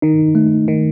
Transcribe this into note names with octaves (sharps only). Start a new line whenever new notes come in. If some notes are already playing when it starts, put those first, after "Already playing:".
D#3 D#4
A3
D#3